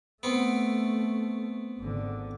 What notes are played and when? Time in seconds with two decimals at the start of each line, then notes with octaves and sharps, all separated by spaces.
0.23 A3 B3 C4
1.79 G#1 D3